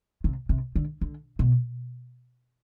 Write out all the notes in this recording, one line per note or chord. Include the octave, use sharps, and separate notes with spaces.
C3
C3
D3
D3
B2